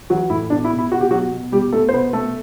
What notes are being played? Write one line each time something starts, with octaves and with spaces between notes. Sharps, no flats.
E3 F#3 F#4
A2 E4
B2 D4
E4
B2
E4
B2 F#4
G4
B2 F#3 F#4
B2
B2 G3 G4
B2 A3 A4
C5
B2 B3 B4
B2 A3 A4